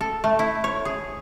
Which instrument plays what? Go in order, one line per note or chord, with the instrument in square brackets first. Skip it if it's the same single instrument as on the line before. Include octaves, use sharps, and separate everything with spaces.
[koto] A4
A3
E4
C#5
G#4